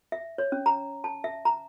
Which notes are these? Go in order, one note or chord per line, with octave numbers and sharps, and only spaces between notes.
E5
C#5
C#4
A#5
A5
E5
A#5